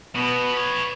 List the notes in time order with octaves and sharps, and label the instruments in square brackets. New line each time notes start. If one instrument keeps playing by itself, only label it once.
[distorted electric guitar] B2 [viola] B3
[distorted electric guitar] B4 C#5